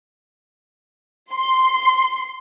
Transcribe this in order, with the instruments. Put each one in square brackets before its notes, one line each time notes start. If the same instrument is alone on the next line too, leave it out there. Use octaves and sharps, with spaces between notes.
[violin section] C6